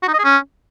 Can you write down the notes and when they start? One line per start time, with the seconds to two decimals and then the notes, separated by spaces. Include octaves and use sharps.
0.03 F#4
0.08 D#4
0.14 D#5
0.19 G#4
0.24 C#4